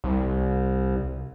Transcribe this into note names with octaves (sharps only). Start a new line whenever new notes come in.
C2